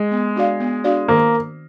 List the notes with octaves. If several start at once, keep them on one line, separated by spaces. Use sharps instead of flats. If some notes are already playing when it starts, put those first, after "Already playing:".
Already playing: G#3
B3
D4 F#4 D5 F5
B3
D4 F#4 D5 F5
D#3 A#3